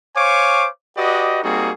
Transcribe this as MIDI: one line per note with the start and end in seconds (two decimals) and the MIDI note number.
0.15 0.68 72
0.15 0.68 73
0.15 0.68 77
0.15 0.68 80
0.15 0.68 85
0.15 0.68 86
0.97 1.41 66
0.97 1.41 67
0.97 1.41 71
0.97 1.41 74
0.97 1.41 75
1.43 1.71 55
1.43 1.71 58
1.43 1.71 60
1.43 1.71 63
1.43 1.71 66
1.43 1.71 68